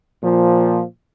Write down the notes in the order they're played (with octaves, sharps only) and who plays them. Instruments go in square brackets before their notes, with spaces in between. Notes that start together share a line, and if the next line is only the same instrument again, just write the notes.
[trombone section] A#2 F3